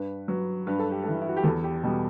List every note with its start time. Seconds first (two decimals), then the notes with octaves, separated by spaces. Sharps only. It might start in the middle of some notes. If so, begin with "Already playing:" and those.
Already playing: G2 B4
0.28 F#3 B4
0.67 G2 B4
0.79 A4
0.91 G4
1.03 E3 G3 A4
1.21 E4
1.28 F#4
1.37 G4
1.44 E2 A4
1.64 G4
1.83 B2 G3 G4